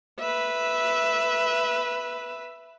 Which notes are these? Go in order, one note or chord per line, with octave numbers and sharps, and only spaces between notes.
B4 E5